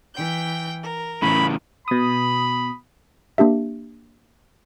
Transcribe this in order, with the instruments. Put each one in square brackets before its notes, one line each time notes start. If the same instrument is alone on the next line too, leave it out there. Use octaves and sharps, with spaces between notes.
[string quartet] E3 G5 G6
A#4
[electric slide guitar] A2 C#3 E3 [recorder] B5
[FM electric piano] B2 D#6 [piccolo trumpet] B5
[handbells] A#3 D4 G4 E5